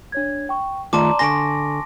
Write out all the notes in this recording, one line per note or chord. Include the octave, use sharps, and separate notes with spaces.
D4 C#5 G#6
G5 C#6
D#3 A3 F4 D5 A5 A#5 C6 D6
D3 G#5 C6 C#6 A#6 D7